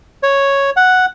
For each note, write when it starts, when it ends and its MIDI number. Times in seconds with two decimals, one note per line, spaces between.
0.23 0.70 73
0.77 1.06 78